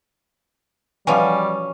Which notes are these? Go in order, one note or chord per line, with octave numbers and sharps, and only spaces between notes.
B2 E3 F3 G3 C#4 G#5